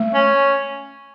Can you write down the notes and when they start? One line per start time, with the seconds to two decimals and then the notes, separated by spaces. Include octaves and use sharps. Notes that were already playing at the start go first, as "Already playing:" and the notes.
Already playing: A3
0.14 C#4